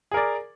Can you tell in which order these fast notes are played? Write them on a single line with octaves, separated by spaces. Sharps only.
G#4 A#4 D5